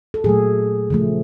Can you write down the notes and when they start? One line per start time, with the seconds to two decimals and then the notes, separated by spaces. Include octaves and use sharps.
0.14 A4
0.24 A#2 F#3 A3 G#4
0.90 C#3 F3 A3